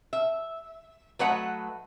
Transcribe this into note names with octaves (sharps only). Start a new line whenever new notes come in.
E5
F#3 A3 B4 D#5 F#5 A#5